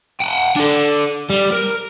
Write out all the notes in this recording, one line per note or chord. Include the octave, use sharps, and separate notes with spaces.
F#5 G5
D4 A4
G3
A#4